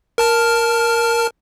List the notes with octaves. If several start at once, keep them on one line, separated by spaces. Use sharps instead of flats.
A#4 A5 F6